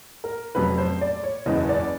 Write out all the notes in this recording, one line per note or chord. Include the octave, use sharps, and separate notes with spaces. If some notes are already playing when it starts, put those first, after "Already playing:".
A#4
F1 F2 C#3 F#3 B4
C5
D5
C#5
F#1 E2 C#3 D#5
D5